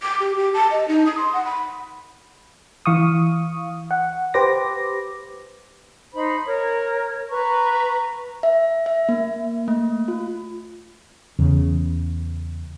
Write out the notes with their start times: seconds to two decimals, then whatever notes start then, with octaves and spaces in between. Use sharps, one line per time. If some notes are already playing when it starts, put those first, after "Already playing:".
0.02 D6
0.20 G4
0.37 G4
0.54 A5
0.71 D#5
0.88 D#4
1.06 D#6
1.18 C6
1.33 F#5
1.45 B5
2.86 E3 F5 C#6 D#6
3.91 F#5
4.34 G4 B4 C5 D6 A#6
6.13 D#4 C5 B5
6.45 A#4 C#5
7.29 B4 A#5 C#6
8.43 E5
8.86 E5
9.09 A#3
9.68 A3
10.08 F4
11.39 E2 C#3